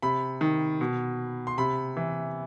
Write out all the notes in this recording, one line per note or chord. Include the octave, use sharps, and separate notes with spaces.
C3 B5
D#3
B2
C6
C3 B5
E3